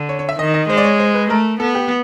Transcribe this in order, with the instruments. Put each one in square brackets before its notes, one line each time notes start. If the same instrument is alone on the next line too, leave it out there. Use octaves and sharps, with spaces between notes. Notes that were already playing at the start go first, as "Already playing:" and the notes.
Already playing: [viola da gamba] D3
[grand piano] C#5
C#5
E5
[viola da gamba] D#3 [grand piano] D#5
[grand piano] D#5
[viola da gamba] G#3 [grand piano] C5
[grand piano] D5
C#5
C5
B4
[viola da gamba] A3 [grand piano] A#4
[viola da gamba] B3 [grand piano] A4
[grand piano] G4